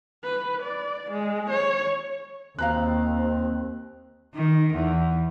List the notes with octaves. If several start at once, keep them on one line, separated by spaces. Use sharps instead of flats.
B4
D5
G#3
C#5
D#2 C4 F5 A#5 F#6
C4
D#3
E2